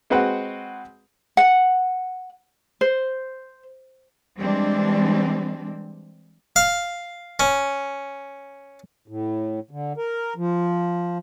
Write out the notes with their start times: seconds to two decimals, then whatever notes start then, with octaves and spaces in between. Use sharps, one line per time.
0.10 G#3 C4 F#4 B4 F#5
1.37 F#5
2.81 C5
4.38 E3 G3 G#3 C4 D4
6.56 F5
7.40 C#4
9.08 A2
9.71 D3
9.97 A#4
10.36 F3